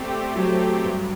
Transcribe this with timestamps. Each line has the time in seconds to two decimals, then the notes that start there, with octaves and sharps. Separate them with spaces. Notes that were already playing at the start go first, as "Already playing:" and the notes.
Already playing: G3 A3 C4 G4
0.35 F#3
0.85 G2